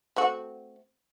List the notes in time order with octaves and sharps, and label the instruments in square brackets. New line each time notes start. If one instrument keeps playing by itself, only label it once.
[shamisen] A3 C4 F#4